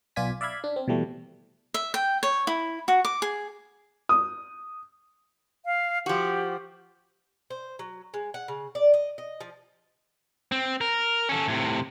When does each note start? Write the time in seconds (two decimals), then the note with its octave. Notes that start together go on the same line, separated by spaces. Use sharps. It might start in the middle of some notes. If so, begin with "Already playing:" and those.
0.16 B1 B3 F4 D5 G#5 B6
0.41 D5 E5 F5 B5 G#6
0.64 D4
0.76 C4
0.88 B2 E3 G3 A3
1.74 E5
1.94 G5
2.23 C#5
2.47 E4
2.88 F#4
3.05 D6
3.22 G#4
4.09 D#6
5.65 F5
6.06 F3 F#4 G4
7.50 C5
7.79 F#3
8.14 G#3
8.34 F#5
8.48 C#3
8.75 D5
8.94 D#5
9.18 D#5
9.41 F3
10.52 C4
10.81 A#4
11.29 C#4 A4
11.48 A2 C3